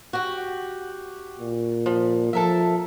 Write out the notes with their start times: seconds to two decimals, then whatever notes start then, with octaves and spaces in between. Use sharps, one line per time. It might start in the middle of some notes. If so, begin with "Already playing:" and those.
0.13 F#4 G4
1.39 A#2
1.86 F3
2.33 F3 A4 A#4 E5